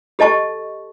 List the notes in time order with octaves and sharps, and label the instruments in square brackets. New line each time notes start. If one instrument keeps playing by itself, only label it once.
[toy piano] G4 A4 D#5 A5 C#6